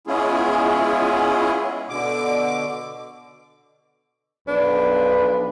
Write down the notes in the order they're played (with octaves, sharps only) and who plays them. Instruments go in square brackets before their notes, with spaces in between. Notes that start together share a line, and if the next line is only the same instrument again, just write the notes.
[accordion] G#3 B3 C#4 E4 F4 G#4
B2 D3 D6
[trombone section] B1 F3 B4 [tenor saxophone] D4